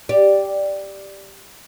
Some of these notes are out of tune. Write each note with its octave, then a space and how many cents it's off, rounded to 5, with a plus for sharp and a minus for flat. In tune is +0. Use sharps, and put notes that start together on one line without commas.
G4 +0 D5 +0